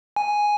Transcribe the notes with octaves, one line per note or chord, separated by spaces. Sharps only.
G#5